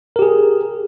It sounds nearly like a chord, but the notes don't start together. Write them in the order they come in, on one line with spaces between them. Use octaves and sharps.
A#4 G4 G#4